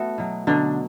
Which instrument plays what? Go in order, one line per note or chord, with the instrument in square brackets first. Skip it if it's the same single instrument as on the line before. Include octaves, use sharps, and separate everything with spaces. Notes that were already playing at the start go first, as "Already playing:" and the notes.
Already playing: [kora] A3 B3 F#4 A4
B2 F#3
B2 D3 F#3 D4